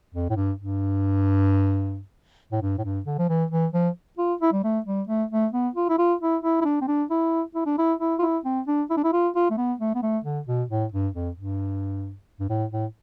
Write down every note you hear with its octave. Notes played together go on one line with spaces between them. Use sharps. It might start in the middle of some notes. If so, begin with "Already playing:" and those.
F2
A2
G2
G2
A2
G2
A2
G2
D3
F3
E3
E3
F3
F4
E4
G3
A3
G3
A3
A3
B3
F4
E4
F4
E4
E4
E4
D4
C4
D4
E4
E4
D4
E4
E4
F4
E4
C4
D4
E4
D4
E4
F4
F4
A3
B3
A3
B3
A3
D3
B2
A2
G2
F2
G2
G2
A2
A2